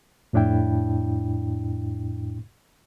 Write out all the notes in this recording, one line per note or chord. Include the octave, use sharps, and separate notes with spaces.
F2 A2 D4 E4 G5